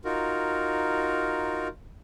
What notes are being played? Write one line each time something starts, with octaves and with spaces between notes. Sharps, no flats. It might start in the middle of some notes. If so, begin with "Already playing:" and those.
D#4 F4 F#4 A#4